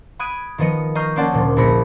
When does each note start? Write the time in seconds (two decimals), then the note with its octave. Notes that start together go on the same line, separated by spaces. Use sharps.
0.19 B5 D#6 F#6 G#6 D7 D#7
0.58 D#3 F3 B3 D#5 C#7
0.95 D#5 A#5 C#6 F6 G6 C7
1.16 A#3 C#4 C5 D5 F#5 A5
1.33 D2 A#2 F3
1.57 A#1 E4 B5 A#6 C#7